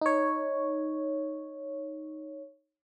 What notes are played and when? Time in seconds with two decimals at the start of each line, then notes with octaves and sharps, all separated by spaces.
0.01 D#4 C#5